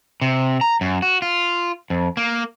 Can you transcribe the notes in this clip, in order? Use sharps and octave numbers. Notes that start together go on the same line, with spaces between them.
C3
A#5
F#2
F#4
F4
F2
A#3